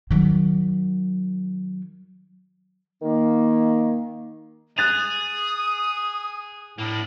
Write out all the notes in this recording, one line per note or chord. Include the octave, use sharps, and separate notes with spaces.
D#3 F#3
D#3 A#3
G#4 D#6 F#6 A6 F7
A2 A#3 D4